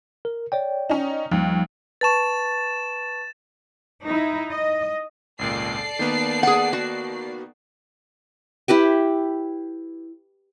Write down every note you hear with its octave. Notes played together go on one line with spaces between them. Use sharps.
A#4
C#5 D5 G5
C#4 D#4
D#2 F3 G3
B4 A5 C#6 A6 E7
D#4 E4
D#5
G#1 C#2 A#2 A4 D5 C7
D#3 A#3 B3
G#4 F#5
F#4
E4 G4 B4 G5